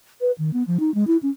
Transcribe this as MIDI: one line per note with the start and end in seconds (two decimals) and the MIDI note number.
0.21 0.32 71
0.38 0.53 51
0.53 0.63 59
0.67 0.78 53
0.80 0.93 63
0.94 1.06 56
1.07 1.17 64
1.23 1.30 61